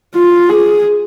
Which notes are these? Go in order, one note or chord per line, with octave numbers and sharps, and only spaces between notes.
F4
G#4